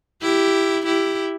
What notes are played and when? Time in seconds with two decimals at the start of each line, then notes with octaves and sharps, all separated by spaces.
0.22 E4 G4
0.86 E4 G4